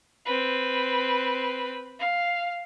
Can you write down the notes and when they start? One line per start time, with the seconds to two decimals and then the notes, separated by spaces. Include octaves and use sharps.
0.26 C4 B4
1.99 F5